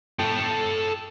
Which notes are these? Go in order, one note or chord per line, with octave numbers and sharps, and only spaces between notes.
A4 G5